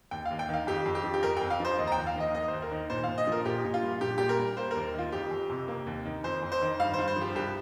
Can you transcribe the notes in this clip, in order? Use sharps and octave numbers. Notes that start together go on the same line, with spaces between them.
D#2 G5
F5
D#2
G5
D#3 F5
F2 G4
F2
G4
F3
G4
F2 A#4
G5
F2
F5
F3 C5
D#2 D#5
A#5
G5
D#2
F5
D#3 D#5
A#3 D#5
C5
D#2
A#4
D#3
A#2 C5
F5
A#2
D#5
F3 A#4
A#2 G4
A#2
F4
G3
A#2 G4
A#2 G4
A#4
G3
A#3 C5
D#2 A#4
D#3 F4
F2 G4
F2
C3
A#3
D#2
D#3
F2 C5
F2
C5
D#3
G2 F5
C5
G2
C5
F3 G4
C2 G4